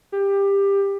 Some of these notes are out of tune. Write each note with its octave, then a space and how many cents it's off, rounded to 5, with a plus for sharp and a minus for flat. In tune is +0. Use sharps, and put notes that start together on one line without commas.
G4 +20